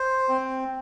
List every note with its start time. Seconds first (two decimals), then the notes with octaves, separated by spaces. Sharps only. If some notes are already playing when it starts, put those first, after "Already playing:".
Already playing: C5
0.29 C4